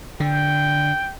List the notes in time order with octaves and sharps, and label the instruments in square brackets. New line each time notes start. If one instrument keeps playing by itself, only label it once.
[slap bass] D3 [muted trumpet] G5